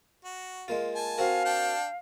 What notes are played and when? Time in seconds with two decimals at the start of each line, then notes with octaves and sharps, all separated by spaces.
0.25 F#4
0.68 G#3 A#3 F4
0.95 G#5 A5
1.18 C4 F#4 A#4 F5
1.45 D4 G5 A5